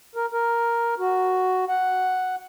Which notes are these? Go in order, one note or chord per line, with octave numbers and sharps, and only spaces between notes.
A#4
A#4
F#4
F#5